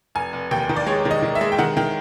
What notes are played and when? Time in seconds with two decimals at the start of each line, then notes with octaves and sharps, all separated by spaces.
0.15 F1 G#5
0.33 F1
0.51 D#2 G5
0.69 D#3
0.76 D5
0.87 G#3 C#5
1.05 D#3
1.11 D#5
1.22 D#3
1.35 E5
1.41 G#3
1.52 G5
1.58 D#3 F#5
1.77 D#3 G5